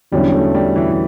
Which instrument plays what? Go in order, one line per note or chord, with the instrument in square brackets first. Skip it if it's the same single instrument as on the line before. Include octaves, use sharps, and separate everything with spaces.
[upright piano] E2 D3 F#3 C#4 E4 [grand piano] G3
[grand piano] A3
G3
E3
E3